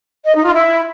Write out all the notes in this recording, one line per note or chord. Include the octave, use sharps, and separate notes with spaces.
D#5
D#4
F4
E4